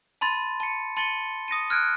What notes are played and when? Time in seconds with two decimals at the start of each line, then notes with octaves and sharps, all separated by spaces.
0.21 A5 B5 C6 A6
0.60 A5 C#7
0.97 A5 C6 A6 C#7 G7
1.48 D#6 A#6 C#7 D#7
1.70 F6 F#6 G#6 D7